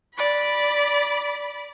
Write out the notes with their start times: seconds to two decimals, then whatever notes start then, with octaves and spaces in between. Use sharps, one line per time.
0.15 D5 B5